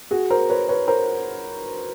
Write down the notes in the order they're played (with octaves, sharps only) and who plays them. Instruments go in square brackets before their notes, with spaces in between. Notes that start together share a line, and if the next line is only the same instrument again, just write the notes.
[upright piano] F#4 G#4
A#4 C5
B4 C#5
B4 C#5
A#4 C5